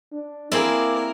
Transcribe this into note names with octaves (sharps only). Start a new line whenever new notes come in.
D4
A#3 C4 E4 G#4 A#4 D5